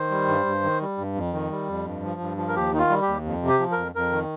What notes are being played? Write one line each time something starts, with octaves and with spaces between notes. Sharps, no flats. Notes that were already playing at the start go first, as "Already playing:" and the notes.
Already playing: D#3 C5
G3
G2
G2
D#3
G3
G2
F2
D#3
G3
F2
G2
F3
G2
F3
A#4
D#2 G4
D#3 D#4
F4
G3
G4
D#2
F2
C3
G4
F3
A#4
F2
F2 A#4
D#3